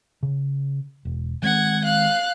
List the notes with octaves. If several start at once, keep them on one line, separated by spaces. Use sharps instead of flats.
C#3
E1
D#3 G#3 C4 F#5 G#6
F5 F#6